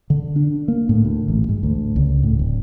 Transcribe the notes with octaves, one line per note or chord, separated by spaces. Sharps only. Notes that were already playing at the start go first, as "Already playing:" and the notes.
D3
D4
A#3
A2
D2
A1
G#2
D2
C#2
A2
D1